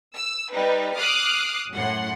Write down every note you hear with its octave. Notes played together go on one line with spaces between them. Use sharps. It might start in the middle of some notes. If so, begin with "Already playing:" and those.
E6
G3 D#4 B4
D6 D#6 F6 F#6 C7
F#2 A2 F#5 C6